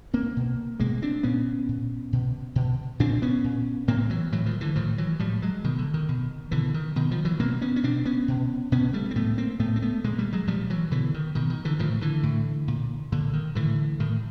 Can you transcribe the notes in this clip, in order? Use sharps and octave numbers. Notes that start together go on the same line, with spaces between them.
A#3 C4
B2
B2 G#3 A#3
C4 D4
A#2 B3 C#4
A#2
B2
B2
A#2 C4 D4
B3 C#4
A#2
A2 A#3 C4
E3 F#3
A2 E3 F#3
D#3 F3
D3 E3
A2 D#3 F3
E3 F#3
A2 F3 G3
F#3 G#3
B2 D#3
D3
D#3
B2
B2 D3 E3
D#3
B2 D#3
D#3 F3
E3 F#3
B2 A#3 C4
B3 C#4
C#4
B2 C4 D4
B3 C#4
B2
B2 B3 C#4
G3 A3
C4
A2 A3 B3
A#3 C4
A2 A3 B3
C4
A3 B3
A#2 G#3 A#3
G3 A3
F#3 G#3
A#2 F3 G3
E3 F#3
B2 D3 E3
D#3
B2 D#3
D#3
D3 E3
A2 D#3 F3
D3 E3
A2
A#2
A#2 D3
D#3
A2 D3 E3
A2 D#3